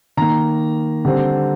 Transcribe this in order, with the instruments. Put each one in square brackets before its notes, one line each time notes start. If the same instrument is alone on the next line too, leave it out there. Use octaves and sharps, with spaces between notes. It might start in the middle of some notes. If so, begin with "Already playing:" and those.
[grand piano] D#3 A#3 A#5
D3 G3 C4